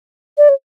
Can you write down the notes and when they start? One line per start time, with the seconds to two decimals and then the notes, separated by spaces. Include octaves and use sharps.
0.38 D5
0.49 C#5